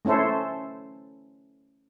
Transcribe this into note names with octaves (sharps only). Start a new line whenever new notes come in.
A3 C#4 E4 A4 C5